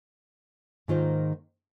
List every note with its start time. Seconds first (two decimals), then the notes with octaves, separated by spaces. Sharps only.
0.88 G#2 D#3 A#3 F4 C5